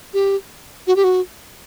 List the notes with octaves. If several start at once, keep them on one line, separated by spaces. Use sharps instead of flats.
G4
F#4
G4
F#4